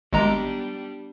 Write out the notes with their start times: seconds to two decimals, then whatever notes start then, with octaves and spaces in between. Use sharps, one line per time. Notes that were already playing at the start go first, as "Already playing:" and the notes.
0.13 G#1 G3 G#3 B3 D4 A#5